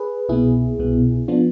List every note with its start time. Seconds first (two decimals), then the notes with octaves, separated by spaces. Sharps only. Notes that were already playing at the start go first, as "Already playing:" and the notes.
Already playing: G#4 B4
0.29 C2 B2 B3 E4 G#4
0.78 C2 B2 B3
1.28 F3 B3 D4 F4